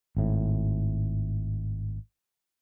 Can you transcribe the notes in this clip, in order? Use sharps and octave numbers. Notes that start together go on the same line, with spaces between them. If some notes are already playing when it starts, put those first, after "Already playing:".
G#1 A2